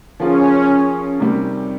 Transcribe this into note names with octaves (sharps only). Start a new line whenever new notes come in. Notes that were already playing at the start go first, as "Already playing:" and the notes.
F3 A#3 C#4 F4 G#4
C3 D#3 G3